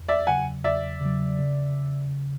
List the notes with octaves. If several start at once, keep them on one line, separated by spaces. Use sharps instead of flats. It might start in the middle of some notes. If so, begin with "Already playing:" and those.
Already playing: E2
D5 E5
C#3 F#3 F#5 G#5
E2 D5 E5
C#3 F#3
C#3